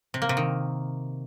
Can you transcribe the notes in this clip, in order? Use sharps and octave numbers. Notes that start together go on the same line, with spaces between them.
C3
A#3
C3
D#3